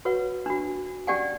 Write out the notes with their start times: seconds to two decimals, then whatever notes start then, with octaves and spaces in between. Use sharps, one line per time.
0.05 F#4 B4 C#5 F#5
0.46 D4 F#4
1.07 C#4 G4 D5 F#5 G#5